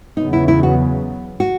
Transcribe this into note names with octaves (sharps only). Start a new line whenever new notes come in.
E2 C#3 F#3 B3 D#4
E4
E4
F#4
F#4